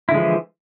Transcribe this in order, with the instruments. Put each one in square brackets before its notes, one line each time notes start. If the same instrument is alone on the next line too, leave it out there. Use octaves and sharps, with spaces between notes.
[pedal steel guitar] E4
D3
G#3
F3
E3